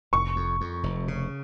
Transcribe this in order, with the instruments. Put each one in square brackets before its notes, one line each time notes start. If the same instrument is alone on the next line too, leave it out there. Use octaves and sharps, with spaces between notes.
[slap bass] F1 [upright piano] C#6
[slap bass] F2
F2
F1
C#3